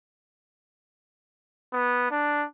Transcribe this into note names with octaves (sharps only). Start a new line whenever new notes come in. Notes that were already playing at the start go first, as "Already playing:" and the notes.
B3
D4